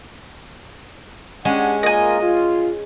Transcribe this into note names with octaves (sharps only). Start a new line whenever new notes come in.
G#3 C#4 D4 G4 F#5
A#3 F4 A#4 D#5 G#5
F4